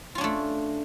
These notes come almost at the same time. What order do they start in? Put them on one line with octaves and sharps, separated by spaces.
F4 C#4 D4 A3